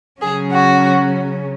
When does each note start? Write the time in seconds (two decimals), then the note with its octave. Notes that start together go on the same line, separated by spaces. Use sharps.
0.20 C#3 F#3 C#4 G#4
0.51 F#4